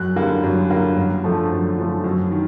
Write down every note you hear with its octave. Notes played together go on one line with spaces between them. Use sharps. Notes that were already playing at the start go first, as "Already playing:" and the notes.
Already playing: F#2 F#6
D3 G3 A#3
F#2
D3 G3 A#3
F#2
D3 F3 A3
F#2
D3 F3 A3
F#2
D#3